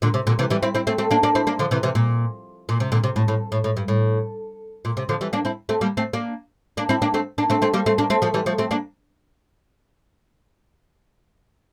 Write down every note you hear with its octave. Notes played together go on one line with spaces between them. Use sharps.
A#2 D3
C3
A#2 D3
C3 E3
E3 G3
C4 E4
C4 E4
A3 C4
A3 C4
A#3 D4
A#3 D4
C4 E4
A#3 D4
D3 F3
C3 E3
C3 E3
A#2
A#2
C3
A#2 D3
C3
A2
A2
A2
A2
G2
A2
A#2
C3
D3 F3
E3 G3
A#3 D4
C4 E4
A3 C4
G3 A#3
A3 C4
A#3 D4
A#3 D4
C4 E4
A#3 D4
A3 C4
A#3 D4
A3 C4
A3 C4
G3 A#3
A3 C4
A#3 D4
A3 C4
F3 A3
E3 G3
F3 A3
A3 C4
A#3 D4